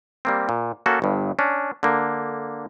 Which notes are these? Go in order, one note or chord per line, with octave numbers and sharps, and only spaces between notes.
G3 A#3 C4
A#2
A#3 C#4 F#4 A4
G1 G2
C#4 D4
D3 A#3